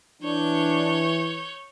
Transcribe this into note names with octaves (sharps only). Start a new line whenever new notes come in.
E3 D4 C#5 G6